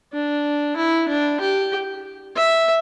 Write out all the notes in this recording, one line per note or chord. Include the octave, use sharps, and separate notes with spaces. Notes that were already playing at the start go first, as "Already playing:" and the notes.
D4
E4
D4
G4
E5